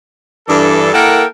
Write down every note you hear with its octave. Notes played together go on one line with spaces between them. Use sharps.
G2 E3 D4 A4
A#3 E4 A4 A#4 F#5 G5